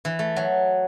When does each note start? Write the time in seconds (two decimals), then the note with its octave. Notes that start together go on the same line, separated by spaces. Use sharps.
0.05 E3
0.19 A3
0.36 F#3